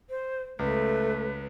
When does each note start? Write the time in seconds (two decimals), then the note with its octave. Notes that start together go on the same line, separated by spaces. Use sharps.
0.10 C5
0.59 C#2 A3 B4